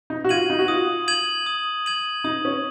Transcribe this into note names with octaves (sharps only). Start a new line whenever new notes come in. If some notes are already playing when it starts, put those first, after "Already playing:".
D#4
F#4
F4 G#6 D#7 F#7
D#4
F#4
F4 D#6
G#6 D#7 F#7
D#6
G#6 D#7 F#7
D#4 D#6
C#4